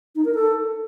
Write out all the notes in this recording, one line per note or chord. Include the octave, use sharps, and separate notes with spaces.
D#4
A#4
A4